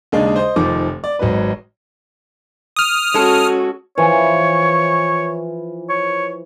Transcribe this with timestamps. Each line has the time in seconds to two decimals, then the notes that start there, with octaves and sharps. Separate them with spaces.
0.12 D#2 C#3 G#3 D4 D#4
0.36 C5 D#5
0.56 F1 D#3 F3 D6
1.04 D5
1.19 G#1 F#3 D#4 B4
2.77 D#6 F6
3.14 G#3 C#4 F#4 A4
3.98 E3 F3 C#5
5.89 C#5